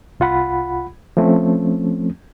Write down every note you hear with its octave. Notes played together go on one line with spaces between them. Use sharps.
C2 F4 F#5 B5
F3 A3 C4 C#4